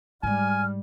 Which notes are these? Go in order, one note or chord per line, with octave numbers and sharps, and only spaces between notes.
G#2 G3 G#3 G#5 F6